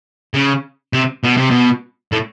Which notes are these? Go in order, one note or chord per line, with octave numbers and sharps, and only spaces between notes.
C#3
C3
B2
C3
B2
A2